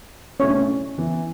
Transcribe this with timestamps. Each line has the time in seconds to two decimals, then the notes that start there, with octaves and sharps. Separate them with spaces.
0.40 B2 A3 C#4 E4 C#5
0.49 D4
0.59 C#4
0.98 E3 B3 E4